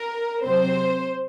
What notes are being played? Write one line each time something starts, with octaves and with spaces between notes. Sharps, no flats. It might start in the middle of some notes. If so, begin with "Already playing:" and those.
Already playing: A#4
C3 F#3 C4 C5